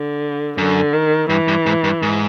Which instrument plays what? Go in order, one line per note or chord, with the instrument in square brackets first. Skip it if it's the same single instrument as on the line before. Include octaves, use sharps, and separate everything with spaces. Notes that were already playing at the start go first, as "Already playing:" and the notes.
Already playing: [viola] D3
[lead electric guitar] F#2 [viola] D3
[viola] D#3
[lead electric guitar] G2 [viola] E3
[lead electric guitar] G2
G#2
G2
G#2